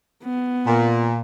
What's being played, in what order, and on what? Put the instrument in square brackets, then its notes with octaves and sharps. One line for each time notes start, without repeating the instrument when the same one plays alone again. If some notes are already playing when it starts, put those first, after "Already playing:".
[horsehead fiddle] B3
[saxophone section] A#2